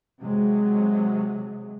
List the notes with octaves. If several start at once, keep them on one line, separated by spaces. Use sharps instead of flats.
C3 F#3 G#3